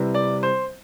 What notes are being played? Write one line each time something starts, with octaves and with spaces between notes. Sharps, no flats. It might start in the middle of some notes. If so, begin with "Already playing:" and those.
Already playing: C3 G3 C4 E4 B4
D5
C5